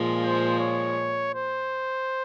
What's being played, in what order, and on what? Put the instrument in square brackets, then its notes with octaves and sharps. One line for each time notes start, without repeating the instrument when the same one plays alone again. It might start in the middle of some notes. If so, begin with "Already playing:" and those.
Already playing: [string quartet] A#2 F3 G#3
[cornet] C5
C#5
C5